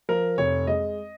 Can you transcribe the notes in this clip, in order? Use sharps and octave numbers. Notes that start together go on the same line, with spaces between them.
F3 A#4
F1 C#5
G#3 D#5